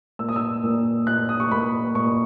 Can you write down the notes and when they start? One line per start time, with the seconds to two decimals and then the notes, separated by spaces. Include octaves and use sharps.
0.19 A#2 E6
0.29 D#6
0.36 E6
0.64 A#2
1.07 A#2 F#6
1.29 D#6
1.40 C#6
1.51 A#2 B5
1.95 A#2 C#6